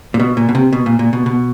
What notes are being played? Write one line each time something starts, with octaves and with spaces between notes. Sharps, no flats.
A#2
B2
A#2
B2
C3
B2
A#2
A#2
B2
B2